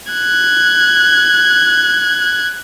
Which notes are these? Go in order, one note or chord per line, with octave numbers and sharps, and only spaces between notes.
F#6 G#6